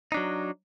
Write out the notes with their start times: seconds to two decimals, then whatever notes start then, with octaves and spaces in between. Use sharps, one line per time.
0.12 D#4
0.14 D4
0.17 F#3